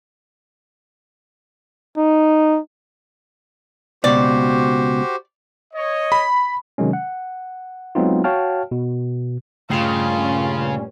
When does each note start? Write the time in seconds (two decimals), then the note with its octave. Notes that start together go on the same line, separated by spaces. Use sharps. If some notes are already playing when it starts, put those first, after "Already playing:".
1.97 D#4
4.04 C#2 B2 F#4 G4 C5 D5
5.74 C#5 D#5
6.12 B5
6.78 C3 D#3 F#3 G#3 C#4
6.93 F#5
7.95 F#3 G#3 B3 C4 D#4 F4
8.24 F#4 C#5 F5 G5 A5 F6
8.71 B2
9.70 G2 A#2 C#3 A3 C#4 F4 G5 C7